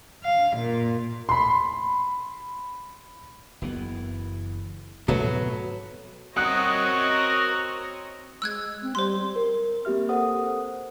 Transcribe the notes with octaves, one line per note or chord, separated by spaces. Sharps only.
F5
A#2
B5 C6
F#1 E3 B3
G#2 B2 F#3 A3 B3
C4 F#4 A#4 C#5 D#5 F#5 D#6 F#6
G#3 E6 F#6 G#6
C4
G3 C5 C6
A#4
A#3 C4 G4 E5 F6
A4 A#4 C5 F#5 D#6